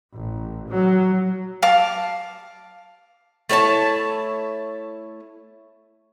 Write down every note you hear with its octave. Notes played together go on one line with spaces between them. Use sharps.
A1
F#3
F5 A5 D6
A3 E4 C#5 A5